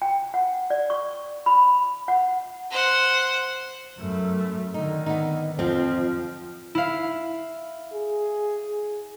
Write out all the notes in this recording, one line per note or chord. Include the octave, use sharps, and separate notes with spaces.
G5
F#5
D5
C#6
B5
F#5
C5 F#5
F#2 A3
D3 D#3 D#4
B3 D#4
F2 F3 C4
E4 F5
G#4